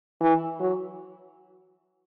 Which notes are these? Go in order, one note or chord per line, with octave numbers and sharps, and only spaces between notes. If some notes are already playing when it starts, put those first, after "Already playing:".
E3
F#3